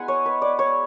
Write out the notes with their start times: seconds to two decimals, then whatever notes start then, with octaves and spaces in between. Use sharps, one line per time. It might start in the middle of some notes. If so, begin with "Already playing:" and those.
Already playing: G#3 B3 E4 F#5 G#5
0.08 C#5
0.26 B4
0.42 D5
0.59 C#5